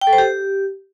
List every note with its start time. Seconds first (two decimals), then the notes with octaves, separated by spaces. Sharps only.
0.01 G5
0.07 A4
0.13 C5
0.18 G4